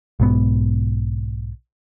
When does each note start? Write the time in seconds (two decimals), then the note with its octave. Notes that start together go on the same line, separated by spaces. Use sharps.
0.20 B1 G#2 B3